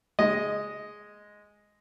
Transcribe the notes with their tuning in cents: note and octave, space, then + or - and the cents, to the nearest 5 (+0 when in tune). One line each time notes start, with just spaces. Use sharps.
G#3 +0 D#5 +0